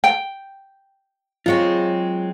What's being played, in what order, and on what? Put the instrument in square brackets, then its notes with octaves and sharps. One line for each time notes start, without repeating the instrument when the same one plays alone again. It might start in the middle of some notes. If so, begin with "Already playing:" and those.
[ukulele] G5
[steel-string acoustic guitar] F#3 G#3 C4 [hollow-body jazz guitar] F4 C#5